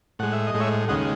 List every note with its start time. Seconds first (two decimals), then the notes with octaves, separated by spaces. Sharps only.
0.19 A2 G#3 F#5
0.33 E5
0.47 D#5
0.54 A2 G#3
0.60 C#5 E5
0.88 D#2 C#3 G#3 D#5 F#5